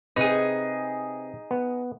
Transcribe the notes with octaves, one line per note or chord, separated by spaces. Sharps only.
C3 D#4 G#4 B4
B3